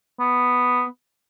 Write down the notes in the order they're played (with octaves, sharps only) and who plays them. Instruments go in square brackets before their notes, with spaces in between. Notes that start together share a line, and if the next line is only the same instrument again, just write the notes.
[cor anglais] B3